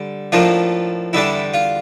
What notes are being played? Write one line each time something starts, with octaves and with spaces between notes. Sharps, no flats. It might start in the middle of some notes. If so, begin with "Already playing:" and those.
Already playing: D3 G3
A2 F3 A#3 D4 F4
E2 D3 G3 D4 E4
F4